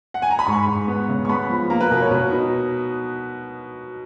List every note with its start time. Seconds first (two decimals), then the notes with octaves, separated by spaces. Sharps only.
0.14 F#5
0.22 G#5
0.31 A#5
0.39 B5
0.47 G#2 C#6
0.67 G#2
0.88 B3
1.09 C#3
1.25 C#6
1.29 B3 B5
1.49 F3
1.70 A#3 A#5
1.80 B4
1.91 B2 A#4
2.01 C#5
2.11 B2 B4
2.32 D#4